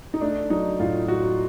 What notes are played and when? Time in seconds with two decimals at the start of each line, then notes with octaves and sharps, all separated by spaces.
0.14 D#4
0.21 A3 D4
0.50 F#3 D#4
0.79 A2 F4
1.08 A2 F#4